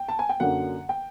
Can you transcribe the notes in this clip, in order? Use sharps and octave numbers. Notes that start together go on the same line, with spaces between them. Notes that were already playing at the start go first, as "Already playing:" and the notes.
Already playing: G5
A5
G#5
G5
F#2 D3 F#3 A#3 D4 F#5
G5